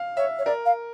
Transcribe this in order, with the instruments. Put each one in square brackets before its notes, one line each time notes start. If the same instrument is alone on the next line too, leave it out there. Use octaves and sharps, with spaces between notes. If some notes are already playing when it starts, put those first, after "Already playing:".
Already playing: [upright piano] F5
[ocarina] C#5 [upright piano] E5
[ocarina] C#5
[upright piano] A#4 [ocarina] D5
[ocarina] F5